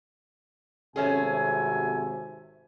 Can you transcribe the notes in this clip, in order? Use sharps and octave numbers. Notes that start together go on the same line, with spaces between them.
G#1 C3 A3 C#4 G#4 G#5